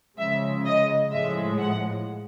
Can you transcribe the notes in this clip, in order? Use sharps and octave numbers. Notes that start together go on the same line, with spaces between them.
C#3 F3 G#3 E5
D#5
A2 F3 G#3 E5
F#5